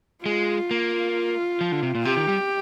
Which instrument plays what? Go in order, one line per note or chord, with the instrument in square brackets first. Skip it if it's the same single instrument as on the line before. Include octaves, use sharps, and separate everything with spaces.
[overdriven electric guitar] G#3 [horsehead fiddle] F4
[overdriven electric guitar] A#3
F3
D3
C3
A#2
[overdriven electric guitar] C3 [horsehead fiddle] G4
[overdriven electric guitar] D#3
G3